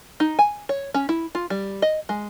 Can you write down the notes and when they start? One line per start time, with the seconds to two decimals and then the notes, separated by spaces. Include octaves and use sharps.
0.20 D#4
0.39 G#5
0.69 C#5
0.94 C#4
1.09 E4
1.35 F4
1.50 G3
1.82 D#5
2.09 G#3